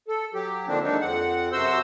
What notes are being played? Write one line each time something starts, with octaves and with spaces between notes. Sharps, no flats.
A4
F#3 G4
D3 D#3 F3 A#3 C4 D4
D#3 F#3 G#3 A#3 D4 D#4
F2 C4 F#5
F#2 C3 F#4 C5 C6 E6